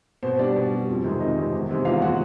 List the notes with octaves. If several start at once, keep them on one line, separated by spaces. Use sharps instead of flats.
B2 C4 C5
G3 D4 D5
B2
G3
F2
C3 D#3 G#3
F2 D#4 D#5
C3 D#3 G#3
E2
C3 D#3 G#3
E2 F4 F5
C3 D#3 G#3 F#4 F#5